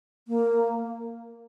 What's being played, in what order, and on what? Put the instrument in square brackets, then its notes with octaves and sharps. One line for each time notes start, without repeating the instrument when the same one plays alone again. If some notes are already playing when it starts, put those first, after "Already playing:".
[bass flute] A#3